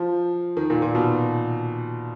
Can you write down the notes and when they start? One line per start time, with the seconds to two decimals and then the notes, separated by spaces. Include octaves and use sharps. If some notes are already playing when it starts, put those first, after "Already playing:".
Already playing: F3
0.57 D#3
0.70 A#2
0.82 A#2
0.95 B2